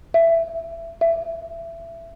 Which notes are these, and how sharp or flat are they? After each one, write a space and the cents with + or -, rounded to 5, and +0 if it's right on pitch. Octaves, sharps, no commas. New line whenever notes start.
E5 +15
E5 +20